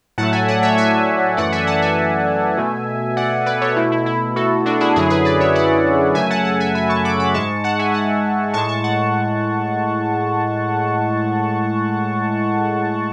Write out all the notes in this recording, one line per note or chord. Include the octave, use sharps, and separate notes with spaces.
A2 F#3 A3 F#5 A5
E5 G#5
D5 F#5
C#5 E5
E5 G#5
F#2 E3 A3 D5 F#5
E5 G#5
F#5 A5
E5 G#5
B2 A3
D5 F#5
B4 D5
A4 C#5
B2 A3 E4
E4
E4
F#4 A4
D4 F#4
E4 G#4
F#2 D3 F#3 E4 G#4
G#4 B4
B4 D5
C#5 E5
D5 F#5
F#2 C#3 F#3 A3 E5 G#5
F#5 A5
F#5 A5
E5 G#5
G#5 B5
A5 C#6
B5 D6
B5 D6
G#2 G#3 A5 C#6
F#5 A5
E5 G#5
F#5 A5
A2 G#3 A5 C#6
A5 C#6
F#5 A5